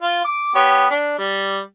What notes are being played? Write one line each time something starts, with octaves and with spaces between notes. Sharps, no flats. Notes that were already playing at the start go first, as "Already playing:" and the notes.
F4
D6
B3 G4 C#5
D4
G3